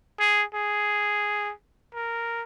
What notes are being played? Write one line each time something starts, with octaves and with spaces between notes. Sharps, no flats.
G#4
G#4
A#4